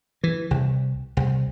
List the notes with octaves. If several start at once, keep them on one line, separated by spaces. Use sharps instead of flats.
E3
C2
C2